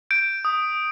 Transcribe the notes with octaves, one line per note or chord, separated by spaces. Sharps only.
G6 D7
D#6